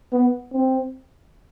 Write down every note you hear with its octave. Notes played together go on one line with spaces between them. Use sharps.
B3
C4